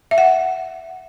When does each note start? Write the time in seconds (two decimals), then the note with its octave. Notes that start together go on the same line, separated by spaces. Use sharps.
0.11 E5
0.18 F#5